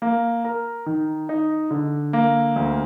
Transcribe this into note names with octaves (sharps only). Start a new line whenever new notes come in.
A#3
A#4
D#3
D#4
D3
A#3
D2